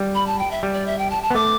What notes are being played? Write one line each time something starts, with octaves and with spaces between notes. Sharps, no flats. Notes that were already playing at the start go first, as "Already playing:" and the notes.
Already playing: G3
B5
A5
G5
E5
G3
D5
E5
G5
A5
A5
B3
A3 D6